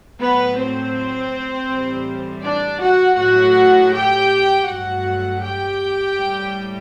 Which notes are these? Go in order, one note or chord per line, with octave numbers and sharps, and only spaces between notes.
A2 F#3 A3 B3 B4
C4 C5
A2 E3 G3
D4 D5
F#4 F#5
A2 F#3 A3 F#4 F#5
G4 G5
G2 F#3 A3 F#4 F#5
G4 G5
A2 G3